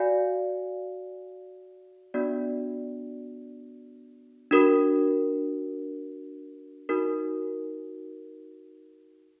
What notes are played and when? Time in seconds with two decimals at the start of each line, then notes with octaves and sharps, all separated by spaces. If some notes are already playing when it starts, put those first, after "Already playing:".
Already playing: F#4 D5 F5 G#5
2.14 B3 D4 F#4 D5
4.51 D4 F#4 A#4
6.89 D#4 F#4 A#4